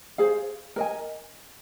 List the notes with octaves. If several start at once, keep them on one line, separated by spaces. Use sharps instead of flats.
G#4 C5 F5
A#4 D#5 G#5